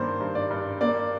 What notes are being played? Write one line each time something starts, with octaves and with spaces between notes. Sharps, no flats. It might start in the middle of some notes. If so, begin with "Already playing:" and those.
Already playing: G2 D#3 A#3 C5 D5
G2
D5
G2
A#3 D5